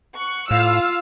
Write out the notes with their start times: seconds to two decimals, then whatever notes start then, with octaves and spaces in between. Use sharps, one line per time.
0.17 F#5 C#6
0.51 A2 F4 F5 E6